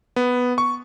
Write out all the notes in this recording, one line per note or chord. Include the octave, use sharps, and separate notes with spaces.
B3
C#6